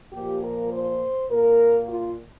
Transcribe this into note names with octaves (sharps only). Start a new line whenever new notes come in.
A#2 F3 A#3 G4
A#4
C5
A#2 A#3 A#4
F4